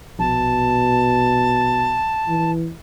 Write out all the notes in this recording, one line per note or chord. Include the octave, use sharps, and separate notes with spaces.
A#1 B2 A5
E3